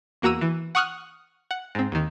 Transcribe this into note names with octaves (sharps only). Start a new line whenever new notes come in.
E2 A#3 F#4 A#5 E6 D#7
E3
F#5 C#6 D#6 F6 F#6
F#5
G#2 C4
D#2 D#3